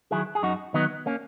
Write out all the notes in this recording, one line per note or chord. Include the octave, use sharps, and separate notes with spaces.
D#3 F#3 E4 G#4
G#4
F#2 D#4 F#4
D#3 F#3 B3 D#4
A#3 C#4